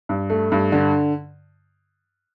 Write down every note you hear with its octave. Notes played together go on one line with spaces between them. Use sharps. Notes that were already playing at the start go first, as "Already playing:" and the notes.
G2
A3
G2
D3